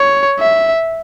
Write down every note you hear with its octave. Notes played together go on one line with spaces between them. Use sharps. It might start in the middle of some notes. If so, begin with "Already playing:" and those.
Already playing: C#5
E5